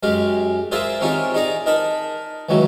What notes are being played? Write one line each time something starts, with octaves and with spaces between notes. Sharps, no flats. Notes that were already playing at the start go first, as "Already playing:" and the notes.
F#2 G#3 G4 F5
F4 G#4 A#4 C5 D5 E5
C4 C#4 D#4 F4 G4 A#4
D#4 G#4 D5 A#5
D#4 A#4 D#5 A5 B5
C#2 D#3 E3 F#3